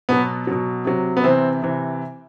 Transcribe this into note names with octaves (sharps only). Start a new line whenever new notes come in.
B2 F#3 B3
B2 F#3
C3 F#3
B3
C3 E3 C4
C3 E3